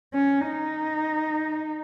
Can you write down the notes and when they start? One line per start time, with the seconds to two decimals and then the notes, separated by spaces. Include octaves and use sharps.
0.14 C#4
0.48 D#4